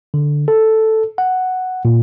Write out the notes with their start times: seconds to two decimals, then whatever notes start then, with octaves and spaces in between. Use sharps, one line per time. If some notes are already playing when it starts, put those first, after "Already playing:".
0.14 D3
0.48 A4
1.18 F#5
1.85 A#2